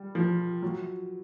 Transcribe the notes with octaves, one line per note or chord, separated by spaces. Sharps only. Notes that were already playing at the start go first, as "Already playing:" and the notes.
Already playing: G3
F3
F#3